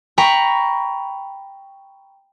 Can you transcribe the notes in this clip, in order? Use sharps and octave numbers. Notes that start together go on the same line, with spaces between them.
G5 A#5 B5 C#6